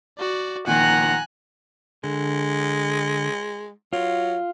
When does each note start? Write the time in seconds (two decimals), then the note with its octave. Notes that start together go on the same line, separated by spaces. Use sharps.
0.18 F#4 D5
0.67 A#2 D#3 F3 F#5 G#5 A#5 F#6
2.04 D3 G#3
3.93 F#3 F4